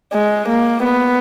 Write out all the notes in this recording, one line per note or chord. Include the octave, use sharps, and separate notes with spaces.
G#3
A#3
B3